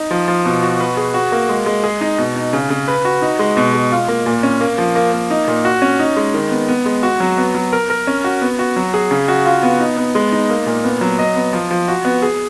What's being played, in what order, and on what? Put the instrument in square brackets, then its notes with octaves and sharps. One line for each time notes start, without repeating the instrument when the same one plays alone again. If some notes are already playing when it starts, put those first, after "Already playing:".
Already playing: [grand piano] D#4
F3
F3
B2
F#4
B4
G#4
F#4
A#3
G#3
G#3
G#4
D#4
B2
D#4
C#3
C#3
B4
F#4
D#4
G#3
B2
G#3
F4
A#3
A#2
C#4
A#3
F3
A#3
A#3
D#4
A#2
F#4
C#4
D#4
G#3
D#3
B3
B3
G#3
F#4
F#3
B3
F#3
A#4
A#4
C#4
F#4
B3
F#4
F#3
G#4
C#3
F#4
F4
B3
D#4
B3
G#3
D#4
A#3
A#2
B3
F#3
D#5
B3
F3
F3
F#4
B3
G#4